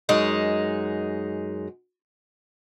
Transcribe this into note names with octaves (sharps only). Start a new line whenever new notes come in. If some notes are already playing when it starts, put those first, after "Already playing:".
F#2 G#3 D#4